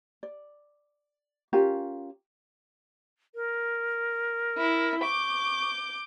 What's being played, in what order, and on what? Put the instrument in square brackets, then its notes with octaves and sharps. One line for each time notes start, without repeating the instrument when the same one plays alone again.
[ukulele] D5
C#4 F4 G4 A#4
[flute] A#4
[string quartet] E4
[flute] C#6 [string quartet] D6 G6